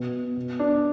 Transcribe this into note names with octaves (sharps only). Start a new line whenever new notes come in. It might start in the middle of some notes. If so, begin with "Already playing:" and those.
Already playing: B2
B2
D4